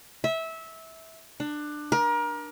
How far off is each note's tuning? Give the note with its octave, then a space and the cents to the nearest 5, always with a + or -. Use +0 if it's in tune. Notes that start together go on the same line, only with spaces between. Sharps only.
E5 -20
D4 +20
A#4 +30